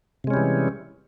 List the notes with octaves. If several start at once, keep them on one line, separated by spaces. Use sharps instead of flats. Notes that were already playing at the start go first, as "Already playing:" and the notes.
C3 E3 G3 G#3 C#4